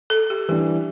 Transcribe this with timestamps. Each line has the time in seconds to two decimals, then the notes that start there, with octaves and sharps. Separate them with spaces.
0.10 A4
0.30 G4
0.48 E3 G3 D4 G4